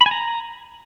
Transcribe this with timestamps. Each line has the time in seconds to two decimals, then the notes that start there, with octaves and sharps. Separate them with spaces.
0.01 B5
0.06 G#5
0.11 A#5